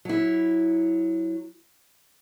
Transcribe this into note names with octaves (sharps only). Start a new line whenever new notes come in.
F#3 E4